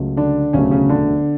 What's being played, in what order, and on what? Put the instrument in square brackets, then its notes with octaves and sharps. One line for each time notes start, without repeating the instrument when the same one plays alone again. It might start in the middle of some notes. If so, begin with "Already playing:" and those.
Already playing: [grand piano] C#2 C#3 F#3 A3
D3 D4
E1 D2 C#3 F#3 A3 C#4
C#3 C#4
D3 D4